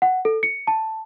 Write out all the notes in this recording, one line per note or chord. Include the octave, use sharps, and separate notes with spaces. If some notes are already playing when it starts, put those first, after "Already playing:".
F#5
A4
C#7
A5